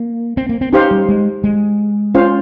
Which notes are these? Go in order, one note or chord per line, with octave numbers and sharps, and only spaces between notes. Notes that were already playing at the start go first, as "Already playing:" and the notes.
Already playing: A#3
C4
A#3
C4
C#4 D#4 G4 C5 F5
G3
G#3
G#3
C#4 F4 C5 F5